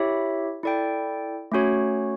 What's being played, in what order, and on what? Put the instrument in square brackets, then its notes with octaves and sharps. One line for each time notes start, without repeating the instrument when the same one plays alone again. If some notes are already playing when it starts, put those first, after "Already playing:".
Already playing: [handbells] E4 G4 C#5 E5
E4 A4 D5 G5
A3 C#4 F#4 C#5